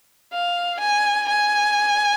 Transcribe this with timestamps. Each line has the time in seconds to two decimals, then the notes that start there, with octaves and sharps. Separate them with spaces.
0.32 F5
0.80 G#5
1.28 G#5